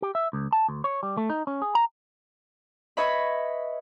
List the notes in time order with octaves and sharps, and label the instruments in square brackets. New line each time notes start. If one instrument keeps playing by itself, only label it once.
[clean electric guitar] G4
E5
C#2
A5
D2
C#5
G3
A3
D#4
C#4
G#4
A#5
[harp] B4 C#5 D#5 E5 B5